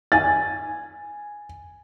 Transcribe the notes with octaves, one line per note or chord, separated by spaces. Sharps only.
G#5 A6